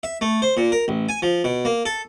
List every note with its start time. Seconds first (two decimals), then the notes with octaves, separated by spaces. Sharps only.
0.03 E5
0.21 A3
0.42 C5
0.57 A#2
0.72 A#4
0.88 A1
1.09 G#5
1.22 F3
1.44 B2
1.65 A#3
1.86 A4